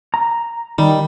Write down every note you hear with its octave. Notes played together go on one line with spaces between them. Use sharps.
A#5
D#3 G3 D#4